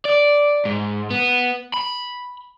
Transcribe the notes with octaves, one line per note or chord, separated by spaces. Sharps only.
D5
G#2
B3
B5